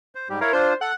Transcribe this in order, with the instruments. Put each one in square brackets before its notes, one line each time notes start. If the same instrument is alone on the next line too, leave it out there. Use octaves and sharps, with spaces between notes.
[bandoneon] C5
G#2 G3 G4
[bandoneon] E4 C#5 F5 [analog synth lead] A#4
[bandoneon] D4 F4 [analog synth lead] C5
[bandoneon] A4 [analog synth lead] F#5